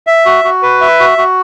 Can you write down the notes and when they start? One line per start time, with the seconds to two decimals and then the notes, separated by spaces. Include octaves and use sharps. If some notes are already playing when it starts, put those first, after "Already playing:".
0.07 E5
0.26 F#4
0.44 F#4
0.62 B4
0.81 E5
1.00 F#4
1.18 F#4